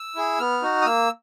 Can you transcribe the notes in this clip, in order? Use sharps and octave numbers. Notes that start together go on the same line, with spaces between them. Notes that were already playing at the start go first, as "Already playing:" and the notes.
Already playing: E6
E4 G#4
B3 F6
D#4 F#4
D#6
A#3 E6